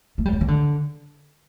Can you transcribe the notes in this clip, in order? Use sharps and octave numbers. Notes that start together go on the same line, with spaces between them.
A3
G3
F#3
E3
D3